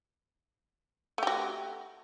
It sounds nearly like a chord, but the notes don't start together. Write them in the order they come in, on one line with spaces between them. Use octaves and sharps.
A3 G4 F#4